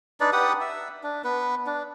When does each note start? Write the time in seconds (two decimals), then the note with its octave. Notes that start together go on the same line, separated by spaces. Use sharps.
0.20 D4 D#4 B4 D5
0.33 G4 B4 F#5 D#6
0.61 E5
1.03 D4
1.24 B3 B4
1.66 D4